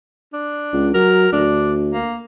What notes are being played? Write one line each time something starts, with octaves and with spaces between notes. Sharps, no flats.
D4
C#2
F#3 A#4
D2 D4
A#3